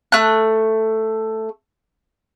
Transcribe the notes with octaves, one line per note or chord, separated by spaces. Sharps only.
A3 F#6